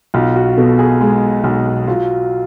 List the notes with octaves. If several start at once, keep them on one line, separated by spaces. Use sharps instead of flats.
B1 F4
F#4
B2 A4
G#4
G#3
B1
F#3 F4